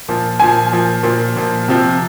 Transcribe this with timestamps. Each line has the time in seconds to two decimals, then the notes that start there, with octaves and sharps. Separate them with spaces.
0.09 A#2 F3
0.40 A#2 F3 G#5
0.72 A#2 F3
1.03 A#2 F3
1.36 A#2 F3
1.68 C3 F3